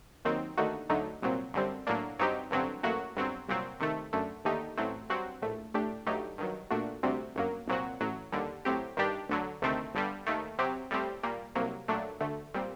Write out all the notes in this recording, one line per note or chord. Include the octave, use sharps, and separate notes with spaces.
D#2 D#3 F#3 C4 D#4
D#2 D3 A3 D#4 F#4
D2 D3 F#3 A3 D#4
C2 A#2 F#3 C4
F#2 D3 G3 C4
A2 F#3 A#3 D4
G2 F#3 C4 D#4 G4
A1 G2 D3 F#3 C4
A1 A2 F#3 A#3 F#4
G1 G2 F#3 C4
C2 A#2 F#3 C4
C3 D#3 A3
F#2 D3 A3
D#2 D3 A3 D#4 G4
A1 A2 F#3 A3 C4
G2 F#3 C4 F#4
A#1 A2 A3
A2 A3 D4 G4
G2 F#3 A3 D#4 G4
G2 D#3 F#3
A#2 A3 D4 F#4
D2 C3 G3 C4 F#4
G1 F#2 F#3 A#3
C2 A#2 F#3 C4 F#4
A1 A2 F#3
D#2 D3 G3
A2 F#3 C4 G4
G2 D#3 G3 D4 G4
D2 D3 F#3
D2 C3 D#3 A3 C4
G1 G2 D3 G3
D#2 D#3 A3
C3 F#3 C4 G4
A2 G3 C4 G4
A#2 G3 A#3
C2 C3 F#3 A#3
A#2 F#3 A3 D4
D2 D3 A3
A#2 G3 C4